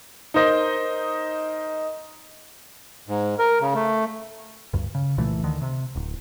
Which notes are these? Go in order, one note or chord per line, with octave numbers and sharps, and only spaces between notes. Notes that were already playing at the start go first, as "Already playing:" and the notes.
D#4 A#4 C5 D#5
G#2
A#4
C#3
A3
D2 G2
C#3
C2 A#2 E3 A3
D2 D3 D#3
C3
D1